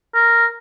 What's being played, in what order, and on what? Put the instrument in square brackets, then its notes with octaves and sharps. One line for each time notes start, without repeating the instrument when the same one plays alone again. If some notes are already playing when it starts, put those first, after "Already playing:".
[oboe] A#4